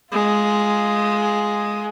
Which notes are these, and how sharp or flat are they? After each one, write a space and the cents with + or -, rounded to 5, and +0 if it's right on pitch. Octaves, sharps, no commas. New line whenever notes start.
G#3 +5 F4 +0